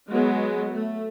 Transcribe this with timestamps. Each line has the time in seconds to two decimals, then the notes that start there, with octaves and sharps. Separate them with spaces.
0.11 F#3 G#3 B3
0.72 A3